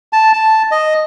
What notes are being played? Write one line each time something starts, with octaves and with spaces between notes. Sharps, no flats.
A5
A5
D#5